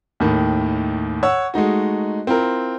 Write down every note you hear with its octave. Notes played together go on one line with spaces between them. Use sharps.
D#2 A2 D#3
C#5 F#5 E6
G#3 A3 D#4 F#4
C4 E4 F4 A#4